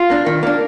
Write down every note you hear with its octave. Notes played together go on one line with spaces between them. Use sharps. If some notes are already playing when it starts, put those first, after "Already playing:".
Already playing: F4
A#3 D4
D#3
A#3 D4